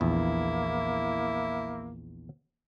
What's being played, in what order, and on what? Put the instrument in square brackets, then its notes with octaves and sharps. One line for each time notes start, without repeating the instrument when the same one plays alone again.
[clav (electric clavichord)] A#1 E2 [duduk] A#3 [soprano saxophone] E4